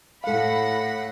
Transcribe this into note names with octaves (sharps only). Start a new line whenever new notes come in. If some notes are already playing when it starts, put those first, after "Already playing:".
A2 A4 F5 F#5 B5